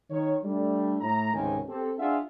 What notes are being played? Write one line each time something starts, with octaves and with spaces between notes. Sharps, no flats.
D#3 C#5
G3 A3 D4
A2 A#5
G#1 C#2 C3 D#3 C#4 G#5
C4 G4 A4
D4 F4 G#4 E5 F#5